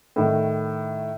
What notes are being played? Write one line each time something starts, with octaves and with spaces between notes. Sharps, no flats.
A2 D#3